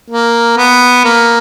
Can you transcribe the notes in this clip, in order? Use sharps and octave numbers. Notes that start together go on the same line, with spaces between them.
A#3
B3
A#3